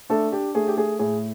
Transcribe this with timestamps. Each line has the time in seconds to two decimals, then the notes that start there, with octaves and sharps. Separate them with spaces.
0.10 A3 D4 A4
0.32 D4 G4
0.55 A3 G#4
0.67 G4
0.76 A3 G#4
0.99 A2 G#4